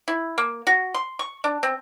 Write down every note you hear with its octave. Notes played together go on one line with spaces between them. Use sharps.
E4
A#3
F#4
C6
C#6
D4
C4